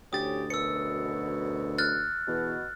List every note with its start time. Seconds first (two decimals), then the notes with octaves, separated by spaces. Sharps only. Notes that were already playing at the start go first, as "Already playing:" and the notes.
0.13 D2 A2 C#4 G4 D#6 A6
0.50 F#2 B2 E6 C#7
1.78 F6 F#6 A6
2.28 E2 B2